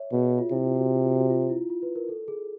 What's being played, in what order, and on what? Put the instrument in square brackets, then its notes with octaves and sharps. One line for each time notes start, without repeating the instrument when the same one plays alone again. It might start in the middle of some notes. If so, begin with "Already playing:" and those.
Already playing: [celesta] C#5 E5
[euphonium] B2 [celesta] G#4
[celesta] F#4
F4
[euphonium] C3 [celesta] E4
[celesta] F4
F#4
F4
F4
F#4
F4
E4
F4
B4
A#4
A4
G#4